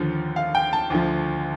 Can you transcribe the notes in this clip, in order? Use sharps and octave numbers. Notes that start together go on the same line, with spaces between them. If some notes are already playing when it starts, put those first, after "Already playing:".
Already playing: D#2 D3 F3
F5
G5
A5
D2 D3 F3